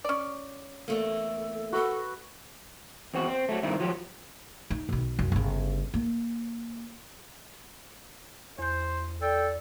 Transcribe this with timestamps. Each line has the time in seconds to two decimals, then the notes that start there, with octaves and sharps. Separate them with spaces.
0.05 C#4 D5
0.88 E2 A3 A#3 A4
1.72 F#4 A4 B4
3.14 E2 C4 F#4
3.28 C4
3.49 F#3 A3
3.63 G2 D#3 C4 E4
3.80 F3 F#3 G4
4.70 D#4
4.89 B1 D#3
5.19 C2 F#2
5.32 G1 C#3
5.94 A#3
8.59 E2 C5 G6
9.22 A4 D5 G5